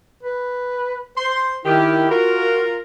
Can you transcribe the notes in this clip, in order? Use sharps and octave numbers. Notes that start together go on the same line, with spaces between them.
B4
C5 C6
D#3 E4 G4
F4 F#4 A#4